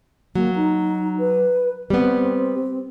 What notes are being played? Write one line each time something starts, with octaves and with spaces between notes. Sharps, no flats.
F#3 A#3
D#4
B4
G3 B3 C4